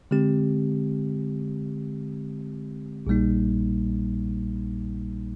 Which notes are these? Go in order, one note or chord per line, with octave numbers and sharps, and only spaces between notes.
D3 G#3 C4 G4
A#1 A#2 G3 A#3 D#4